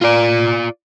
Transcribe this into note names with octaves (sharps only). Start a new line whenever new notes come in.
F4 D5